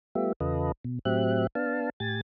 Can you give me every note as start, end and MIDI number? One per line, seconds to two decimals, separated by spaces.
0.15 0.32 55
0.15 0.32 57
0.15 0.32 59
0.15 0.32 65
0.15 0.32 67
0.15 0.32 76
0.40 0.72 40
0.40 0.72 49
0.40 0.72 65
0.40 0.72 69
0.40 0.72 71
0.40 0.72 75
0.84 0.99 47
1.05 1.47 45
1.05 1.47 54
1.05 1.47 60
1.05 1.47 67
1.05 1.47 76
1.05 1.47 90
1.55 1.90 59
1.55 1.90 62
1.55 1.90 77
1.55 1.90 81
2.00 2.21 45
2.00 2.21 67
2.00 2.21 80
2.00 2.21 93